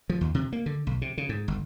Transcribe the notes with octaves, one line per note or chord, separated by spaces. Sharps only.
F3
D#2
C3
A#3
D3
B1
C3
C#3
G#2
G1